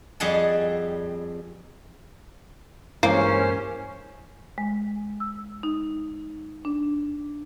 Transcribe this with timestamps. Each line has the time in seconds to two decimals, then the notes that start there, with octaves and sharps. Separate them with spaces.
0.20 F2 G3 G#4 D#5 F#5 A5
3.03 G2 E3 G#3 A#3 C#4 A#4 C5
4.58 G#3
5.20 E6
5.63 D#4
6.65 D4